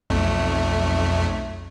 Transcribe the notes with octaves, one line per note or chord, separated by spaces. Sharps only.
B1 F2 A3